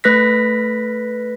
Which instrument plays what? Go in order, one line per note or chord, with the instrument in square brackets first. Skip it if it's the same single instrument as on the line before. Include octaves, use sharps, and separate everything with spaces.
[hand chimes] A3 B4 F#6 A#6 B6